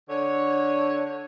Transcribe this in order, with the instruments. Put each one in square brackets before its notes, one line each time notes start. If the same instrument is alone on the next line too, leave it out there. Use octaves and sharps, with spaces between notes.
[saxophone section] D3 C#5